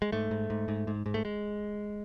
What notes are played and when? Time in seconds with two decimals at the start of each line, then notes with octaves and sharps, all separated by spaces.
0.02 G#3
0.12 G#2 A3
0.31 G#2
0.50 G#2
0.68 G#2
0.87 G#2
1.06 G#2
1.14 A3
1.25 G#3